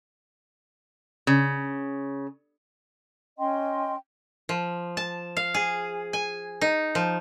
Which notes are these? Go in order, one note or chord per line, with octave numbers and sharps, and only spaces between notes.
C#3
C#4 D#5 G5 C6
F3
A5
F5
G#4
G#5
D#4
F3